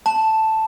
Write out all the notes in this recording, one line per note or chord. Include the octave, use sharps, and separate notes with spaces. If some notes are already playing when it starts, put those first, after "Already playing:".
A5